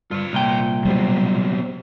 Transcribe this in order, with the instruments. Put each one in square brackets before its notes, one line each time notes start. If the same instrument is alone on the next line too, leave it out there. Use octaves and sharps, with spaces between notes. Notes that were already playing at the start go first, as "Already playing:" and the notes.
[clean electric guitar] G2 [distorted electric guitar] F4 C#5
[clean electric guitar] C2 A#2 G5
[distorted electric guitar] B2 C4 [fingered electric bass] F#3 G3